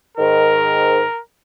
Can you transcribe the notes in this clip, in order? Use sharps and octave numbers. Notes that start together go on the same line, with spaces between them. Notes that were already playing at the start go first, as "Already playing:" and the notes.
G#2 D#3 A#4